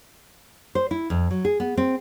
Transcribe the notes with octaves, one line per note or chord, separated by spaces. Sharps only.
C5
E4
F2
F#3
G#4
B3
C4